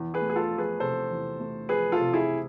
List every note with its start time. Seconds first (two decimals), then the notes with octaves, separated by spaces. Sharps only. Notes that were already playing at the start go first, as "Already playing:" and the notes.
Already playing: E2
0.14 G#4 B4
0.22 A3
0.30 G#4
0.36 F4 A4
0.51 F3
0.58 G#4 B4
0.80 C3 A4 C5
1.10 E2
1.40 A3
1.69 F3 G#4 B4
1.92 F4 A4
1.99 C3
2.13 E4 G#4